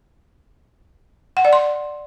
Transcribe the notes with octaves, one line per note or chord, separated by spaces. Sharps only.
F#5
D5
C6